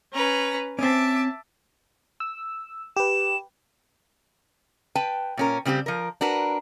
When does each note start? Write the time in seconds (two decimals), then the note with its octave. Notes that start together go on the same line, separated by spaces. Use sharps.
0.12 C#4 B4 A#5
0.79 C4 C#4 E5 A5 D6
2.20 E6
2.97 G4 B4 E7
4.95 B4 G5 A5
5.37 A#2 C#4 A#4
5.65 C#3 G3 C4 F#4 G4
5.86 F3 A#4
6.21 D4 F#4 A#4 B4